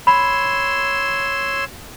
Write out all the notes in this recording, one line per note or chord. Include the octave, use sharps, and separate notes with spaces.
C#5 B5 C6 E6